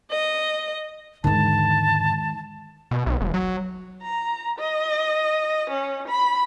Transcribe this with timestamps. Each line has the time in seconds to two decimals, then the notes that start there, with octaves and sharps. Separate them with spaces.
0.11 D#5
1.24 E2 G#2 D3 D#3 G#3 A5
2.91 B2
3.06 B1
3.21 E1
3.34 F#3
4.02 A#5
4.59 D#5
5.70 C#4
6.08 B5